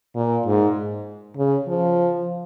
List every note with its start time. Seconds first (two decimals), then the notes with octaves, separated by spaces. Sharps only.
0.16 A#2
0.46 G#2
1.37 C#3
1.68 F3